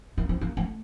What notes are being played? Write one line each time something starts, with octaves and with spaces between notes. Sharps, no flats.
A#3
C4
A#3
A3